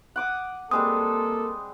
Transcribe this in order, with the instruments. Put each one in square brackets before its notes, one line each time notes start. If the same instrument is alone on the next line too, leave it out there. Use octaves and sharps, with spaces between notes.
[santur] F#5 D6 D#6
[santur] G3 G#3 C4 [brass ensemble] A#3 A4 [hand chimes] D#6